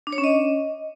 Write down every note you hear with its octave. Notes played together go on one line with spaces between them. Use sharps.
D4
C#5
C#4
D#5